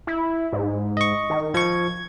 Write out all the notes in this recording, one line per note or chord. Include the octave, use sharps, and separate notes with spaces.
E4
G#2
D#5 C#6
D#3
F3 C#6 G#6